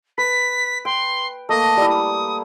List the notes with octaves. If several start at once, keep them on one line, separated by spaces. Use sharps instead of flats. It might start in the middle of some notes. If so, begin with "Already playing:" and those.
B4 B6
G5 C6
A3 A#3 D#5
G3 E4
D#6